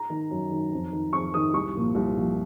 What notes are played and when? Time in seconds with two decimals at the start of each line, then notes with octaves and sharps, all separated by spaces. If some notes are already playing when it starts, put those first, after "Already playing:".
Already playing: A#5
0.10 D#3
0.31 F#2
0.52 D#3
0.73 F2
0.93 D#3
1.12 F2 C#6
1.34 D#3 D#6
1.54 C2 C#6
1.75 A#2 F3
1.95 C2
2.16 A#2 F3